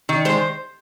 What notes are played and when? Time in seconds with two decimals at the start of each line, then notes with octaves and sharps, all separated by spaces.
0.09 D#3
0.25 G#3 C5